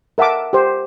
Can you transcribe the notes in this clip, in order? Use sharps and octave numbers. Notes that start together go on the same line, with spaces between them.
A#4 E5 F#5 A5 D6
G4 C5